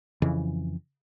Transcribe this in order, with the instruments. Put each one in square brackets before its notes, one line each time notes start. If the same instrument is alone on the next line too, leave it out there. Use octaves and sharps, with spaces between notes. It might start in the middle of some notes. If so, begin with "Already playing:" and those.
[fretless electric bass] F2 C#3 E3